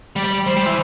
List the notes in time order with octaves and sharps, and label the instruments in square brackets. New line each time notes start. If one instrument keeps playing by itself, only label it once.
[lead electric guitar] G3 [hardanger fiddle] D5
[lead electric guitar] G3 [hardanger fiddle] C5
[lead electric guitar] G3
E3